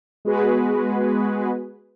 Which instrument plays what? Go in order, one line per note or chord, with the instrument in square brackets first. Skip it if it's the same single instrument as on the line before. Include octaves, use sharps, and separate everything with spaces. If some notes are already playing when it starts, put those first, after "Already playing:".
[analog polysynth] G#3 B3 F#4 G#4 B4